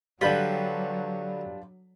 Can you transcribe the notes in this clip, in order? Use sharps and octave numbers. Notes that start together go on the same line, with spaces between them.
D3 F#3 G3 D4 F4 B4 G5 B5